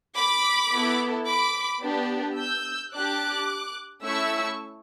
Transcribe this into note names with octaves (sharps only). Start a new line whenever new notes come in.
B5 D6
B3 E4 A4
B5 D6
B3 D4 G4
E6 G6
D4 G4 D6 F#6
A3 C#4 E4 C#6 E6